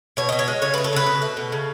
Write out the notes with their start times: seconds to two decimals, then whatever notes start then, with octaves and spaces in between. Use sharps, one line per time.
0.17 B2 C#5
0.29 B2 D#5
0.39 C#5
0.48 G#3
0.62 C#3 C#5
0.74 A3 B4
0.84 A4
0.93 C#3 B4
1.07 B2
1.22 A3
1.37 B2
1.52 C#3